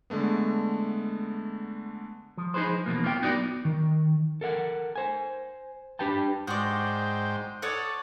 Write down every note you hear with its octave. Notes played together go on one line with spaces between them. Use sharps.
D3 G#3 A3 B3
F3
D#4 F#4 G#4 B4 C5
F3
E2 B2 A#3
A#3 B3 F4 C#5 G5
F#2 B3 D#4 F#4 A#4 D5
D#3
A4 A#4 F5 F#5
C5 G#5
D4 G4 B4 G5 A5
G#2 G#3 F#4 C5 D5 G5
A4 C#5 D5 F#5 D#6